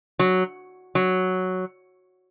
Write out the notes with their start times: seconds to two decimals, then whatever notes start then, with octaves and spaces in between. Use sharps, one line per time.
0.19 F#3
0.95 F#3